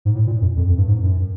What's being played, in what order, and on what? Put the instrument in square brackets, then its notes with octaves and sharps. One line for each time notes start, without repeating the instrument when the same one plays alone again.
[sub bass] G#2
A2
A#2
F#2
F2
F2
G2
G#2
F#2